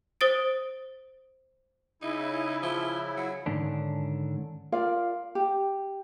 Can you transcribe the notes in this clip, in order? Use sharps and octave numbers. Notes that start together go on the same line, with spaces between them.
C5 D#6 A6 D7
C#3 D#4 E4
F3
F#3
G#2 D3 D#3 C#4 D4
F4 A#4 D5 F5
G4